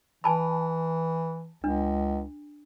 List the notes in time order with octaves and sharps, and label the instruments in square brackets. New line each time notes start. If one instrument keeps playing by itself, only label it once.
[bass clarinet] E3 [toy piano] G#5 A5 B5
[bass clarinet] C#2 [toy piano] D4